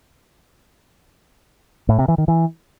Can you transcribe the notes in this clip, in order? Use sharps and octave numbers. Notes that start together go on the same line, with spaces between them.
A2
C3
E3
D#3
E3